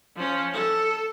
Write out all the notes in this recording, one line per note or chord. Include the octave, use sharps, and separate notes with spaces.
F3 C#4
A4